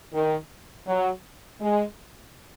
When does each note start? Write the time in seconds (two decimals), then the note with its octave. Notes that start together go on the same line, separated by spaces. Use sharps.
0.13 D#3
0.87 F#3
1.61 G#3